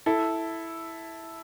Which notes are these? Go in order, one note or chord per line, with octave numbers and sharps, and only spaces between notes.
E4 A4